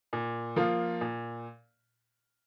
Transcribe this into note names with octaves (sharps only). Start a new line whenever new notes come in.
A#2
F3 A#3 F4
A#2